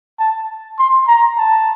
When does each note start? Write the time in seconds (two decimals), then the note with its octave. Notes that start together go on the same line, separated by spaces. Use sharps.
0.19 A5
0.79 C6
1.07 A#5
1.37 A5